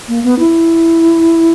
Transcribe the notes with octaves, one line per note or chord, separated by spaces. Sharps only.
A#3
B3
E4